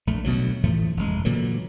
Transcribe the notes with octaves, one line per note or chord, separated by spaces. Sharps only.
A#1 A3
D2 B2 F3 F#3
A2 E3 F3 A3
F1 G#3
A#2 D3 E3 F#3